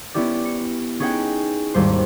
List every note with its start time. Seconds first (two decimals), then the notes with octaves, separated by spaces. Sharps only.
0.14 B3 C#4 E4 G4 D5
0.45 C#7
0.99 B3 C#4 D#4 G#4 F#5 G5
1.74 G#1 D#2 G3 C5